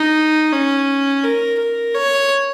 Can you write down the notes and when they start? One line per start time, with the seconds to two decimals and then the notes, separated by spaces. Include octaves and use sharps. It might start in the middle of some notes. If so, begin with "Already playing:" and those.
Already playing: D#4
0.53 C#4
1.23 A#4
1.59 A#4
1.94 C#5